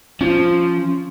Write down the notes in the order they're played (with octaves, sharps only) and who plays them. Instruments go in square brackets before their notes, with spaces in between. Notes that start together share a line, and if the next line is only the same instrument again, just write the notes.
[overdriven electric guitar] F3 [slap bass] C#4